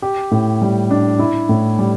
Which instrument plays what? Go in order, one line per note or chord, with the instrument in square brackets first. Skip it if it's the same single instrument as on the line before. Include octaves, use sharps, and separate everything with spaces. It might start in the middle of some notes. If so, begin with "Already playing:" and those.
[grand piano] G4
A2
G3
D4
E4
A2
G3